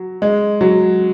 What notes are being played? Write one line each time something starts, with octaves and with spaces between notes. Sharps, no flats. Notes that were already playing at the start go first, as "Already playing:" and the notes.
Already playing: F#3
G#3
F#3